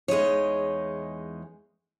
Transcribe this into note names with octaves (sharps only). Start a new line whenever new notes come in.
E2 G#3 D#4 C#5